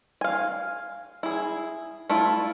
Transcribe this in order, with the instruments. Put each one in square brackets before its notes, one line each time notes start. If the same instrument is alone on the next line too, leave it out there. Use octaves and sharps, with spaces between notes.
[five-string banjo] F5 G#5
E4 G#4
A3 E4 F4